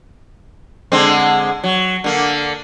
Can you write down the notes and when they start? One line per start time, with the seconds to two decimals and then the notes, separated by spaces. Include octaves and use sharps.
0.92 D3 G#3 C4
1.64 F#3
2.04 D3 A#3